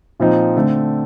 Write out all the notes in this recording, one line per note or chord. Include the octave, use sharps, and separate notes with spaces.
A#2 F3 C4 D#4
D3 A3 C4